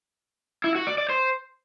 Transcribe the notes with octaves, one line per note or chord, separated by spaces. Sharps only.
E4
F#4
D5
D5
C5